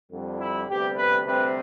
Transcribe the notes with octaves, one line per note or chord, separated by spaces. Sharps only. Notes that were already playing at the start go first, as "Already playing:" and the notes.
F2 D3 G3
E4
D2 C3 G3 B3 G4
B4
D2 C3 G3 C4 B4